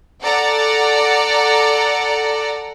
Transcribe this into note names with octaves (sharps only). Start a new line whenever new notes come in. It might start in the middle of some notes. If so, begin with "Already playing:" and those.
A4 D5 F#5 A#5